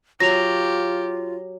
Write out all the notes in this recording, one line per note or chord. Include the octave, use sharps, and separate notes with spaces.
F#3 F4 G4 A#6 F7